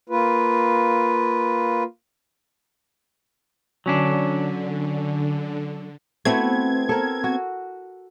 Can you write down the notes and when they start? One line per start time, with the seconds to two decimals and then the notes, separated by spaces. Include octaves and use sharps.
0.10 A#3 F4 B4
3.86 D3 F#3 C#4 D4
6.25 A3 B3 C4 E4 F#4 G#6
6.89 A4 A#4
7.24 F#4